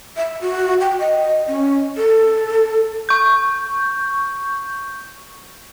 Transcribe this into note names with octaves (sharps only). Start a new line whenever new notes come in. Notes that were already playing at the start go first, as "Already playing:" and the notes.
E5
F#4
G5
D#5
C#4
A4
C#6 G6